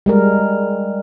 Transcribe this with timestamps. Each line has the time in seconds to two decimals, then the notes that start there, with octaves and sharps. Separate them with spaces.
0.06 G3 G#3 A#4